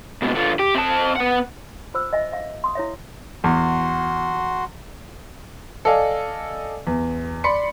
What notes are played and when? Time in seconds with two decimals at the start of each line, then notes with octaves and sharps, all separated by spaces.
0.22 C#2 B2
0.35 D3 F4
0.59 G4
0.75 C4 A5
1.16 B3 F#5
1.94 F4 C5 E6
2.13 D#5 E5 G#5
2.33 E5 F5
2.64 C6 D#6
2.75 E4 C#5 E5
3.44 E2 F#4 C6
5.85 A4 D5 D#5 F5 G#5
6.87 E2
7.44 D5 B5 C6 C#7